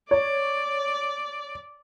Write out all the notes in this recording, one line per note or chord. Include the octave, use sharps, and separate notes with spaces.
C#5 D5